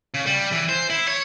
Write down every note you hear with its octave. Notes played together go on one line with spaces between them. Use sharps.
C#3
G3
E3
C5
E4
C#5